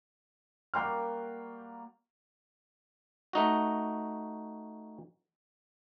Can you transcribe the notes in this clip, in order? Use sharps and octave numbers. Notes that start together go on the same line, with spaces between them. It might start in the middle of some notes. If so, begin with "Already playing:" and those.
G3 A#3 F#4 G5 C6 F6
A3 D#4 F#4